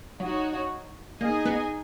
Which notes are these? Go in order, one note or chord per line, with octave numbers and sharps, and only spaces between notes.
F#3 D#4 F#4 C#5
A#3 D#4 G#4 D#5 G#5
B3